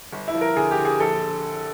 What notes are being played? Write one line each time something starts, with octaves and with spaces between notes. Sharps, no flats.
G1
E4
F3
A#4
D3 G#4
G4
D3
G#4
A#1 A4